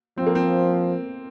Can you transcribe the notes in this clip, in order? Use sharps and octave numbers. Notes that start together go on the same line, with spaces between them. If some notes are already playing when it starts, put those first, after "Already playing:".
F3 C4
A#3
C4